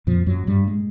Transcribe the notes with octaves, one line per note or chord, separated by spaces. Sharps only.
F2 A#2 F3
F#2 F#3
G2 G3
G#3